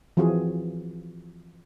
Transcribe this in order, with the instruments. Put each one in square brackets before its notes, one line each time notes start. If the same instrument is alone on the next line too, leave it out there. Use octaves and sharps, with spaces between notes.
[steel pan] E3 F3 C4 F4 F#4 G#4